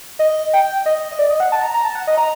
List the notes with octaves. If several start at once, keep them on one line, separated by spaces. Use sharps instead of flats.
D#5
G5
D#5
D#5
D5
D#5
F#5
A5
A#5
A#5
A5
F#5
D#5
A#5